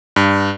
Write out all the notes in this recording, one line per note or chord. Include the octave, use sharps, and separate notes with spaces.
G2